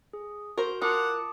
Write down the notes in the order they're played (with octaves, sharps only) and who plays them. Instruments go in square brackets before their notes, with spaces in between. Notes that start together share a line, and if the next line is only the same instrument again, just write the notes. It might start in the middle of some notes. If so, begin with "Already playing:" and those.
[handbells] G#4
[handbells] F#4 [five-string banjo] A#4 C5
[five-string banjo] F4 A#4 [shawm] F#5 [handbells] A5 D6 D#6